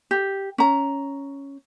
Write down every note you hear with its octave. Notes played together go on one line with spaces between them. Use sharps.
G4
C#4 A#5